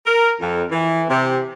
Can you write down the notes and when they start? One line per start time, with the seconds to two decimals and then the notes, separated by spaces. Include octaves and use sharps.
0.06 A#4
0.40 F2
0.72 E3
1.09 C3